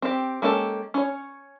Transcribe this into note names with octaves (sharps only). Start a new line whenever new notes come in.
C4 G4
G#3 A#3 C#4 G4 A4
C#4 C#5